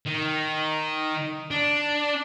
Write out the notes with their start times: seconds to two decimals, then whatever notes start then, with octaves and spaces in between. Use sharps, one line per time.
0.06 D#3
1.51 D4